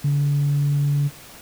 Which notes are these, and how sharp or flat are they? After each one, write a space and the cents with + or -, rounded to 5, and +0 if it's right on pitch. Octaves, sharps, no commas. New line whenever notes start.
D3 -40